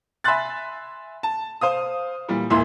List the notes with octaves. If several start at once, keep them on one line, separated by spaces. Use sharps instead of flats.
E5 G#5 B5 C6 F#6 A6
A5
C5 F5 D#6
A#2 E3 G3
E1 A#2 E3 E5 C6